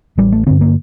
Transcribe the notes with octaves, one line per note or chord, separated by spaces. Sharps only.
A1 G3
A3
G2 D3 C4
A#3